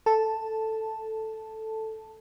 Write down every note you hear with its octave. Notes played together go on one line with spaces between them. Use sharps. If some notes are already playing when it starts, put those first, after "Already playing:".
A4 A5